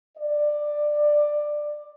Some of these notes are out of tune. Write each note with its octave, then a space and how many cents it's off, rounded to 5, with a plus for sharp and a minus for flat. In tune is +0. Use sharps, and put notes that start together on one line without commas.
D5 +15